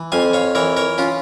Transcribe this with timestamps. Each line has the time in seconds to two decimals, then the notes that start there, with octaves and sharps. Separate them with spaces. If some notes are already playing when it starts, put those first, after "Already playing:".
Already playing: E3
0.12 F2 F5 G#5
0.33 C#5 F5
0.55 E3 A#4 C#5
0.77 A#4 C#5
0.98 C#4 F4